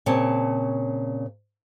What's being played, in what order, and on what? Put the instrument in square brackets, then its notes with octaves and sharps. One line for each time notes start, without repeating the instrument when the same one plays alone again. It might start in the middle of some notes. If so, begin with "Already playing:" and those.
[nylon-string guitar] A#2 C#3 C4 C#5 A5